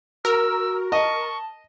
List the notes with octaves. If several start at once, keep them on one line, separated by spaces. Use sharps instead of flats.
F#4 A#4 E6
D#5 A5 C#6